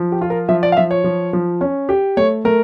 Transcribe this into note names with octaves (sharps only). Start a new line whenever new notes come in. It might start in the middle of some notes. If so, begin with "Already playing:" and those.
Already playing: F3
G4
F4
A#4
F3 E5
D5
F5
F3 E5
C#5
F3
F3
C#4
G4
A3 C#5
A3 A#4